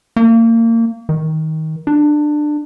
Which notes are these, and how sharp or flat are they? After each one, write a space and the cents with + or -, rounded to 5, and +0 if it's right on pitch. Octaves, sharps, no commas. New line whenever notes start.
A#3 -30
D#3 +20
D4 +20